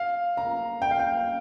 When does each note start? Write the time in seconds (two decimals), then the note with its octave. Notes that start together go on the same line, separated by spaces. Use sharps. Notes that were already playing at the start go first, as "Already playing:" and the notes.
Already playing: F5
0.37 A#5
0.82 G5
0.91 F5
0.99 G5